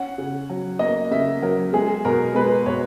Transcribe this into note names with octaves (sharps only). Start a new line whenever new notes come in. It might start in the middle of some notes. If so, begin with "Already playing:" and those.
Already playing: C#4 F#5
C#3
F#3
A#3 D#5
C#3 E5
F#3 A#4
G#3 G#4
B2 A#4
G#3 B4
B2 C#5